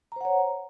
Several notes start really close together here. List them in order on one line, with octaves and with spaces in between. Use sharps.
A#5 C5 F#5 C#5